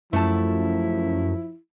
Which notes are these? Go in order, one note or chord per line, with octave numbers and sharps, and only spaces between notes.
F#2 F3 A3 E4 A5